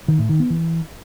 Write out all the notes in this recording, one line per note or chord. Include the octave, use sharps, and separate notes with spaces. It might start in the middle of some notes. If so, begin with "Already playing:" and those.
D#3
A2
D#3
B3
E3